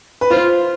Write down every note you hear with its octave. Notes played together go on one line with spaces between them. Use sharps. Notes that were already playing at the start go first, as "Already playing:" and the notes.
B4
F4 C5